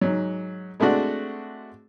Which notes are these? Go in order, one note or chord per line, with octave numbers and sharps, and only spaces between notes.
G#2 F#3
G#3 A3 C4 D4 F#4